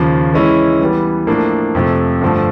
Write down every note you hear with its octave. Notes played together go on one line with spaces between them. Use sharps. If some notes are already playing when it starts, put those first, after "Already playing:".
Already playing: D#2 C#3 F3
E3 G#3 C#4 E4
E3 G3 B3
A2 F3 A#3 D4
F2 C3 F3 A3
G2 D3 F3 A3